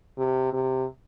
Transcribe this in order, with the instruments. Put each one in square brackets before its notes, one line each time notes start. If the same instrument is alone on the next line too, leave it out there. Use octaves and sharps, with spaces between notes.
[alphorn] C3
C3